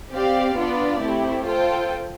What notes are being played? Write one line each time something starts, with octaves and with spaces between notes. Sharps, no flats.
C4 G4 D5 F5
B3 D4 F4 B4 D5
A3 C4 E4 G4
F4 A4 C5 G5